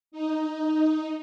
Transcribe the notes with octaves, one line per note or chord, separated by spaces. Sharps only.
D#4